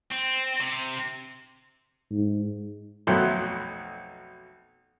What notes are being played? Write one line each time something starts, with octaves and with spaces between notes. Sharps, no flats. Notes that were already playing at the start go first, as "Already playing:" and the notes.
C4
C3
G#2
B1 F2 B2 F#3 A3 C6